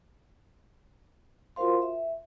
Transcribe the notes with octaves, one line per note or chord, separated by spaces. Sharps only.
F4 F#4 A#4 C5 F5 C6
E5